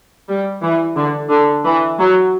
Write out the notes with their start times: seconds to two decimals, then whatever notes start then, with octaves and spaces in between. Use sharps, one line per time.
0.29 G3
0.63 E3
0.96 D3
1.30 D3
1.65 E3
1.99 F#3